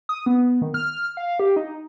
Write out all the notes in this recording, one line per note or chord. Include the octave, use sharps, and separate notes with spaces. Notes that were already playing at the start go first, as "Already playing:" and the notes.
D#6
B3
D#3
F6
F5
G4
D#4